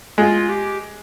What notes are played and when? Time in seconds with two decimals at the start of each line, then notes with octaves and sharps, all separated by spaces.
0.18 G#3 F4
0.49 G4